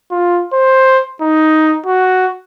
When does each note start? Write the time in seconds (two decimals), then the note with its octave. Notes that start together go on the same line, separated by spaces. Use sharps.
0.11 F4
0.53 C5
1.22 D#4
1.86 F#4